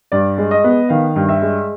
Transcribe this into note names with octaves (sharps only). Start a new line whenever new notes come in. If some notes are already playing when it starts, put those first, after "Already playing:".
G2 D5
G#3
D#5
B3
D#3 F5
G2
E5
G#3